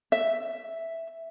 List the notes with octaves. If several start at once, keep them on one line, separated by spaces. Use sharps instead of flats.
E5